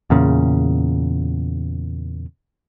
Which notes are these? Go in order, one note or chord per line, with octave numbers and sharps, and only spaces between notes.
E2 A#2 C#3